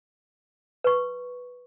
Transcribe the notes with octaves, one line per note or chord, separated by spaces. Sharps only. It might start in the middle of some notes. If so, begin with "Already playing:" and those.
B4 C#6